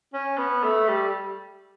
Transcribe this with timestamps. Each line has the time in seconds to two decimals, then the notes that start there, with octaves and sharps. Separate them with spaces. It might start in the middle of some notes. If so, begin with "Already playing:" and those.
0.14 C#4
0.38 B3
0.64 A3
0.89 G3